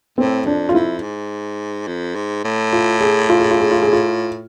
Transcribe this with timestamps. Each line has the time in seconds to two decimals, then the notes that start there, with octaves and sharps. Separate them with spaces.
0.18 A2 C4
0.46 F2 D4
0.69 F4
0.74 F2 E4
1.03 G#2
1.87 F2
2.16 G#2
2.44 A2
2.73 F4
3.01 G#4
3.29 F4
3.40 G#4
3.51 F4
3.60 G#4
3.71 F4
3.82 G#4
3.93 F4